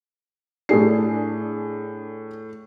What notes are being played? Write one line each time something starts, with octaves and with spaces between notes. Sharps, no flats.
A2 D4 G#4 A4 C7